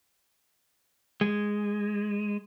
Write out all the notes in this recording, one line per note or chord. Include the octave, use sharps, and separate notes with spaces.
G#3